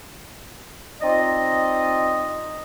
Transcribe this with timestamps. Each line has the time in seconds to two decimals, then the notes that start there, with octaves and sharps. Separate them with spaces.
1.02 C4 D#4 F4 D5 D#5